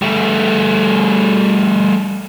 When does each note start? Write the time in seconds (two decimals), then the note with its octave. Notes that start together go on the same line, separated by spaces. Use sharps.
0.02 G3 A3